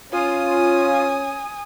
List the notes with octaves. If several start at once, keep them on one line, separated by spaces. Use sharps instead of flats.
C#4 F4 G#5 D#6